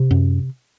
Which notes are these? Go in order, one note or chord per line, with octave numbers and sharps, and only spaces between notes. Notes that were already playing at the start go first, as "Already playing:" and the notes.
Already playing: C3
F#2